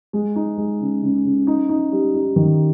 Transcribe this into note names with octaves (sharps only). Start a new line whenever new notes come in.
G#3
D#4
G#3
C#3
C#3
C#3
D#4
D#4
G3
D#4
D#3